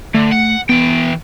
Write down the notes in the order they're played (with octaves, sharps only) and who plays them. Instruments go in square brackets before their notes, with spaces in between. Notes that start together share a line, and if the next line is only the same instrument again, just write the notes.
[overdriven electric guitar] D3 [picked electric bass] A3
[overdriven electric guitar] F#5
[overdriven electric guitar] E3 G5 [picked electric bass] B3